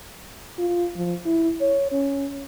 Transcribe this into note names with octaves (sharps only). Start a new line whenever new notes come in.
F4
F3
E4
C#5
C#4